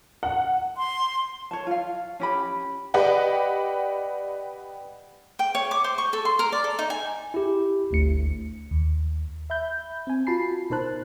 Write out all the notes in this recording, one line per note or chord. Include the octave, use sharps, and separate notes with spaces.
F#5
C6
C#5 A5
F4 F5
C#4 G4 B5
G4 B4 D5 D#5 F#5 G5
G5
C#5
D6
C5
C#6
A4
C6
A#4
D5
A4
D#4
G#5
E4 G4
G1 D2 C#7
D#2
E5 B5 G6
C4 G#5
F4 F#4 A5 B5 C7
B2 D#4 A#4 C5 A5 F#6